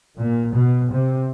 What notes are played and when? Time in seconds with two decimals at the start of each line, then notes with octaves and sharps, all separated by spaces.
0.18 A#2
0.54 B2
0.91 C3